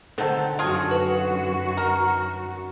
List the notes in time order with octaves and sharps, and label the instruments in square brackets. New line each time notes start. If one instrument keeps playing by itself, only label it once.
[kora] D3 D#3 C4 [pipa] F#3 A4
[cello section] F#2 F#4 [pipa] F4 G#4
[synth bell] B4
[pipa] A#4